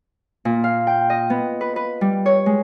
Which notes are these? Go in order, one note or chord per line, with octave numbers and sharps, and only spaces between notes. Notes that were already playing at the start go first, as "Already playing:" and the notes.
A#2
F5
G5
D#5
B3
B4
B4
G3
C#5
G#3